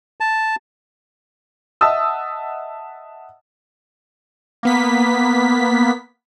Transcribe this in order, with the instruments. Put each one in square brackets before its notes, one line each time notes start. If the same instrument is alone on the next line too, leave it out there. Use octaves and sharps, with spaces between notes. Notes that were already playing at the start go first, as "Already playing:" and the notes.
[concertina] A5
[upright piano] D#5 E5 F#5 A5 D#6 E6
[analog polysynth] A#3 B3 B6